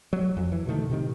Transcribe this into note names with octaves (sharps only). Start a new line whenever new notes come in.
F#3
F2
E3
B2 D3 D#3 A3
A2 C3 D#3